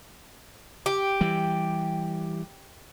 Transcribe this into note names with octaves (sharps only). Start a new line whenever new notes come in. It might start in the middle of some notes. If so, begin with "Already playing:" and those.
G4
E3 G3